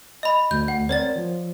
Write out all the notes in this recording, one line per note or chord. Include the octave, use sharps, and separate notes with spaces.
D#5 B5
D2 G6
F#5
C4 A#4 C#5 D5 A6
F3